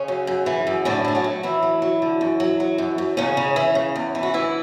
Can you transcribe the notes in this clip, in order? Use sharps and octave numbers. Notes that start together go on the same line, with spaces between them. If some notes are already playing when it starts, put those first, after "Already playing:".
Already playing: C#3 C#4
F#2
F#2
E3
F#2
A2 D3 D4
A2 G#4
F#3 F#4
A2
E3 F#3 E4
F#3
F#3
D3
F#2
F#3
F#3
F#2
F#2
E2 C#3 C#4
C#3
E3
C#3
E2
E3
F#4
D2 E3 E4